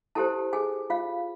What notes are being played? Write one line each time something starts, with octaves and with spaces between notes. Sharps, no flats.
E4 G4 A4 C5 A5
G#4 G#5
F4 F5